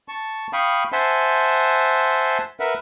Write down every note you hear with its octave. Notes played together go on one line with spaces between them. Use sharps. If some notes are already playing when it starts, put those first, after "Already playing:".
A5 C#6
F5 G5 B5 C#6 D#6
C5 E5 F#5 G#5 A5 C6
A#4 B4 E5 F#5